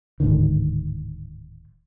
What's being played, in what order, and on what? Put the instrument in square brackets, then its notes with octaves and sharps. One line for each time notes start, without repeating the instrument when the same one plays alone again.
[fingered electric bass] D1 G#2 D3 D#3